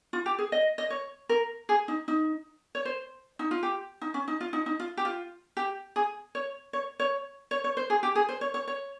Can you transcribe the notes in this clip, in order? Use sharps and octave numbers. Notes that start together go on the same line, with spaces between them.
F4
G4
G#4
D#5
D#5
C#5
A#4
G#4
D#4
D#4
C#5
C5
D#4
F4
G4
D#4
C#4
D#4
F4
D#4
D#4
F4
G4
F4
G4
G#4
C#5
C#5
C#5
C#5
C#5
C5
G#4
G4
G#4
C5
C#5
C#5
C#5